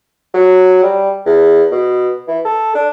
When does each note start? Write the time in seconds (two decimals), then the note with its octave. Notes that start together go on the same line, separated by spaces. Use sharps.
0.34 F#3
0.83 G3
1.26 E2
1.71 B2
2.28 E3
2.45 A4
2.75 D4